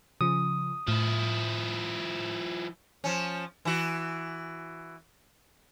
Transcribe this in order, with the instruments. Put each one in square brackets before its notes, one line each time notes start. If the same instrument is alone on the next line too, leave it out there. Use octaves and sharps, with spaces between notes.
[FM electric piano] C#3 F3 [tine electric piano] D#6
[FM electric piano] A2 [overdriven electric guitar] F3 E4
[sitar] F3 C#4
E3 F#4